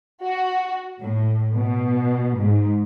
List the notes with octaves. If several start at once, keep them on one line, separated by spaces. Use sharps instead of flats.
F#4
A2
B2
G#2